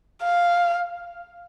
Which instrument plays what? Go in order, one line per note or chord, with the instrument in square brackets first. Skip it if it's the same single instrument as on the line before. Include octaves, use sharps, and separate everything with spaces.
[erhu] F5